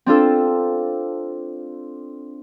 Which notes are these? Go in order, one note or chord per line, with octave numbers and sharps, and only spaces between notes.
C4 D4 F4 A4